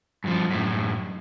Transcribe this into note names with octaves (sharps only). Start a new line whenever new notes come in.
G2 F3
F#2 A2